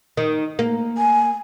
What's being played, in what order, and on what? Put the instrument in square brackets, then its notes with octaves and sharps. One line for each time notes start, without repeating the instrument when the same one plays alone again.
[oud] D#3
A#3
[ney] G#5